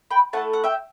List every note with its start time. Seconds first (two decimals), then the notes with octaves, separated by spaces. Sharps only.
0.11 G5 B5
0.33 A3 E4 A4 F#5 A5
0.53 F#5
0.64 E5 G5